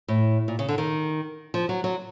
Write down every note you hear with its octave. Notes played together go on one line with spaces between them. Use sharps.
A2
A#2
C#3
D3
D#3
F3
F#3
F#3